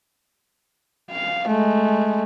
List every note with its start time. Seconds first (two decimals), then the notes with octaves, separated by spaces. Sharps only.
1.11 F5
1.48 G#3 A3